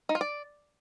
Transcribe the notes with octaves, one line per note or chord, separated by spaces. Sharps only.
D#4
F4
D5